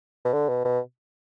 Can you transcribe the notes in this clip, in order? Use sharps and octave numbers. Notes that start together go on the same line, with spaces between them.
B2
D3
B2
B2